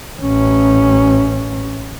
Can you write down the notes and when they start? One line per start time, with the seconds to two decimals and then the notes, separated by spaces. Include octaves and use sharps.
0.21 A1 C#4